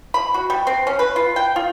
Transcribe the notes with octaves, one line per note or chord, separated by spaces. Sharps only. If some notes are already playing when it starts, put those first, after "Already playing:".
B5
F#4
G3
C4
C#4
B4
F4
G5
F4